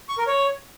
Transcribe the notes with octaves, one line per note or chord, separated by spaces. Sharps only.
C#6
A#4
C#5